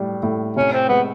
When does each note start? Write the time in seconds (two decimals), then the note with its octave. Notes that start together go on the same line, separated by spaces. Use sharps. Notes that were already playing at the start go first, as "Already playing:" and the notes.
Already playing: A2 G3
0.23 A2
0.56 C3 C#4
0.73 C4
0.89 G#3 B3